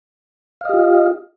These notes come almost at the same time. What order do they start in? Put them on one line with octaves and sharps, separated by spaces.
F5 D#5 G4 F4